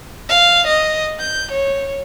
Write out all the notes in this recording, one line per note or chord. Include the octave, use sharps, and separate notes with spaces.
F5
D#5
G6
C#5